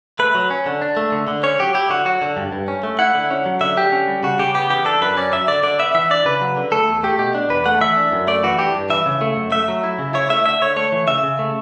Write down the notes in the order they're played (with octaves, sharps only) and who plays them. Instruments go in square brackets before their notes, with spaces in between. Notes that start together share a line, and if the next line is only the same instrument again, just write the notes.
[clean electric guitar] A3 B4
F#3
C#4
D3
D4
A3
D3
D3
C#4 C#5
F#3 G4
E4 G4
D3 F#4
F#3 F#4
D3
G2
G2
C#4
A3
E4 F#5
D3
C#4
F#3
D3 E5
D3 G4
C#4
G3
C#3 F#4
C#3 G4
B3 G4
E3 G4
D4 A4
F#2 B4
C#4 D5
F#3 E5
D3 D5
D3 D5
B3 E5
E3 E5
D4 D5
C#3 B4
F#3
D3
A3 A4
E2
A3 G4
B2 G4
D4
E2 B4
A3 F#5
E3 E5
D4
F#2
A3 D5
E3 F#4
D4 G4
G2
E3 E5
C#3
A3
F#2
A3 E5
F#3
E4
C#3
E4 C#5
A3 E5
D3 E5
D3 C#5
A3 C#5
E3
C#3 E5
C#3
A3